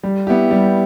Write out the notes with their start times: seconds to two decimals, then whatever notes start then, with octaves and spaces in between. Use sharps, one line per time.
0.03 G3
0.27 B3 E4 G4
0.51 G3